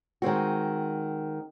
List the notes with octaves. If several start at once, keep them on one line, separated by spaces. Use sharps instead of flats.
D#3 G#3 C4 F#4